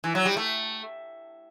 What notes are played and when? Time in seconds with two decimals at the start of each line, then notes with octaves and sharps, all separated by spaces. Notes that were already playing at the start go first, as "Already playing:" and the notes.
0.04 E3
0.15 F#3
0.25 G3
0.37 A3